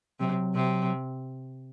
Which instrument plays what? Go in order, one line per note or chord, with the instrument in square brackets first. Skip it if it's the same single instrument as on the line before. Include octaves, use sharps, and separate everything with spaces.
[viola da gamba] C3 [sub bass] F#3
[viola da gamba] C3